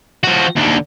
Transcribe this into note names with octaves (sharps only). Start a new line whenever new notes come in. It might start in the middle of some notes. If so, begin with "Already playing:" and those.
F3 F#4
D#2 D3